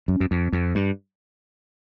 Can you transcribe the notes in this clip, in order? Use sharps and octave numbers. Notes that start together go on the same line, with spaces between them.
F#2
F#2
F2
F2
G2